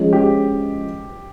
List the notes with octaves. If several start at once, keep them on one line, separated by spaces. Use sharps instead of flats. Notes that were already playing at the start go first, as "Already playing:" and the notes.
Already playing: F3 G#3 C#4 F4
G4